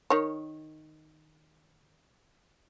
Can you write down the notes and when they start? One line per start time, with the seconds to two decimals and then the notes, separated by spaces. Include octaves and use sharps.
0.10 D#3 C#5